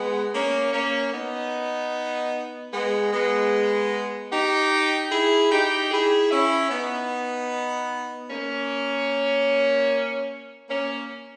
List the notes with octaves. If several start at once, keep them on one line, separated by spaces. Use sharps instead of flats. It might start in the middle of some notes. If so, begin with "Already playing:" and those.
Already playing: G#3 B3
A#3 C#4
A#3 C#4
B3 D#4
G#3 B3
G#3 B3
D#4 G4
E4 G#4
D#4 G4
E4 G#4
C#4 E4
B3 D#4
A#3 C#4
A#3 C#4